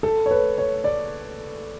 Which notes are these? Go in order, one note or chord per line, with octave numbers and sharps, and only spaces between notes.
A4
C#5
B4
C#5
D5